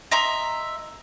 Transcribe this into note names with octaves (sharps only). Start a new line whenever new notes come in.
D#5 E5 A#5 C6